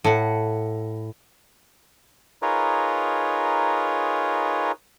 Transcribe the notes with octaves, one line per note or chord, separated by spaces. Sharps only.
A2 F#5
D#4 F4 G#4 A#4 B4 C#5